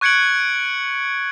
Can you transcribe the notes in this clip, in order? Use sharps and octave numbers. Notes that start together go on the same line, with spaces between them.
C#6 F#6 G#6 C#7 D7 F#7